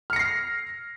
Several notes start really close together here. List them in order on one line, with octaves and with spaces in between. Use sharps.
F6 C#7 A#6 C7